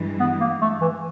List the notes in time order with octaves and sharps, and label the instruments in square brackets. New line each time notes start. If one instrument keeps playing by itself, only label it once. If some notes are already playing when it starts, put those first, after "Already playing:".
Already playing: [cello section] G2 E3 G#3
[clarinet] B3
A#3
A3
E3